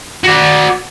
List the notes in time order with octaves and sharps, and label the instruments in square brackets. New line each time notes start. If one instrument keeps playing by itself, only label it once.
[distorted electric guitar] F#4 D5